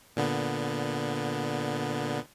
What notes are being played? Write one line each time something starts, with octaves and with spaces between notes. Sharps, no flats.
A#2 D3 B3